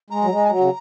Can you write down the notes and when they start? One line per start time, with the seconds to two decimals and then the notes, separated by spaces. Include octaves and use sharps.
0.10 G#3 A#5
0.24 F#3
0.30 G#3
0.45 G#5
0.49 F#3 A#5
0.59 C#3